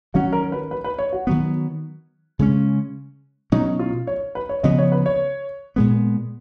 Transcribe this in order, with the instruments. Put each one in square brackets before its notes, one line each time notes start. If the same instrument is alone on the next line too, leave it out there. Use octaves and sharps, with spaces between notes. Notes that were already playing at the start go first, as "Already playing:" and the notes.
[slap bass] D#3 F#3 C#4 [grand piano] F#4
[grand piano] A#4
B4
B4
B4
C#5
F#4
[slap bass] D#3 F#3 B3
C#3 G#3 C#4
[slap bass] B2 F#3 C#4 [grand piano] D#4
[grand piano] F4
C#5
B4
C#5
[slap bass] C#3 F3 B3 [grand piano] D#5
[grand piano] C#5
B4
C#5
[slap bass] A#2 G#3 B3